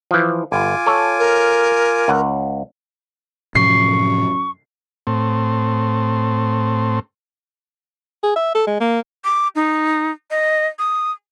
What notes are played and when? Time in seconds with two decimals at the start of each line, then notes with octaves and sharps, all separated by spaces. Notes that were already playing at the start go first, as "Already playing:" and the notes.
0.11 E3 F3
0.52 G1 F4 G#5 D6
0.86 A4 C#5
1.19 A#4
2.08 C#2 F#5
3.55 F#2 A2 C3 F3 C#6 C7
5.07 A2 C4
8.23 G#4
8.36 E5
8.55 A4
8.67 G#3
8.80 A#3
9.24 D6
9.55 D#4
10.31 D#5
10.79 D#6